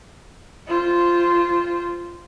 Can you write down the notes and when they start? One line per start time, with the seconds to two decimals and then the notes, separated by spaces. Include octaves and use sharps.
0.68 F4 C5